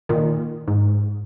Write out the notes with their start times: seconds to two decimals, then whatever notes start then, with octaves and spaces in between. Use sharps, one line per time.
0.09 A#2 D#3
0.68 G#2